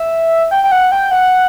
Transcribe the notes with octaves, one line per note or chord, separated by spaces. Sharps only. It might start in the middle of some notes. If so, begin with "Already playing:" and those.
Already playing: E5
G5
G5
F#5
G5
F#5